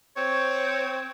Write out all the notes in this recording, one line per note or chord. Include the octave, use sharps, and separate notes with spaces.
C4 C#5